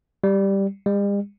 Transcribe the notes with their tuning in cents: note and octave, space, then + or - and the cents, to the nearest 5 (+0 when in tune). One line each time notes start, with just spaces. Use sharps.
G3 +0
G3 +45